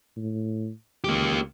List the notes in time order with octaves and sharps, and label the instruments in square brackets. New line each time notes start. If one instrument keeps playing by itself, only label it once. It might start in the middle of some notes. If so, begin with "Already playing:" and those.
[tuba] A2
[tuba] C#2 [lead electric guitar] A#3 G4